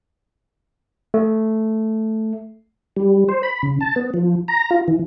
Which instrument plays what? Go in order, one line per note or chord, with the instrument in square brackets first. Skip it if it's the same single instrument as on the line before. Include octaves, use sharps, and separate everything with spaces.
[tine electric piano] A3
[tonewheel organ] G3
C5
B5
C#3
A5
B3
F3
A#5
F4
E3